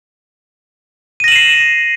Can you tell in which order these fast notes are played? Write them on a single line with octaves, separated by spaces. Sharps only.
D#7 A#6 F#7 E7 C7